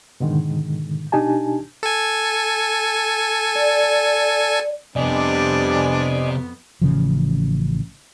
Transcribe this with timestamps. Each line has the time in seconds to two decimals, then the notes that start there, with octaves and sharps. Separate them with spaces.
0.20 G#2 B2 D3 D#3 G#3
1.12 B2 D4 D#4 G4 G#5 A5
1.83 A4 G#5
3.55 D5
4.96 F2 C3 G3 B3 D4 D5 D#5 G#5
6.82 A1 C#3 F3